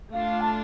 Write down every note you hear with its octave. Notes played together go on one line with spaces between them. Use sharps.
A3 D4 F4 F5
A5